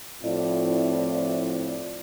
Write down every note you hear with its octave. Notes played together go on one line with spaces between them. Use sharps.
A2 F3 C4 E4 F4 D5